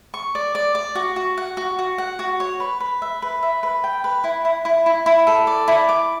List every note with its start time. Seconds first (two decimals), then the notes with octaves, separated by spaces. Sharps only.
0.14 C#6
0.35 D5
0.55 D5
0.75 D5
0.95 F#4
1.16 F#4
1.38 F#5
1.57 F#4
1.79 F#4
1.98 F#5
2.19 F#4
2.40 C#5
2.60 B4
2.80 B4
3.02 E5
3.22 B4
3.43 E5
3.63 B4
3.84 G5
4.04 B4
4.24 E4
4.45 E4
4.65 E4
4.86 E4
5.06 E4
5.27 A4
5.47 D5
5.68 E4
5.89 D6